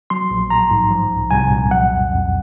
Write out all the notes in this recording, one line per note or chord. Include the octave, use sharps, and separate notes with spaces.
F#3 C6
A#1
A#1 A#5
G#2
F3
C2
C2 G#5
A#2
F#3 F#5
F2
F2